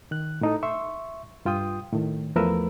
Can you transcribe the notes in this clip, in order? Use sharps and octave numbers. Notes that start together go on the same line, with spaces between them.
D#3 F#6
A2 D#4 A4
E5 C6 C#6
G2 F4 G5 D#6
A2 D#3
E2 F3 A3 A#4 B4 E6